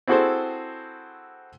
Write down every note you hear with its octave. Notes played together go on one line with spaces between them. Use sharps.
C4 E4 F#4 G#4 A4 C5